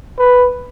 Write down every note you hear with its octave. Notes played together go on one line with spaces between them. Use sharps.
B4